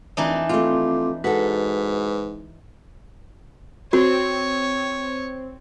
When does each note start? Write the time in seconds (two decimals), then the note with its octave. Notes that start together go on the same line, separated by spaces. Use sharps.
0.17 F1 E3 D4 D#4
0.49 F2 A3 C4 F4 D6
1.24 G#2 F#4 A4 B4
3.93 C4 F#4 C#5